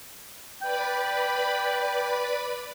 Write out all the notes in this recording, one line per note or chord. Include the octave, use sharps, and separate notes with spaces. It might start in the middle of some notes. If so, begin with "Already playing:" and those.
B4 D5 G5 B5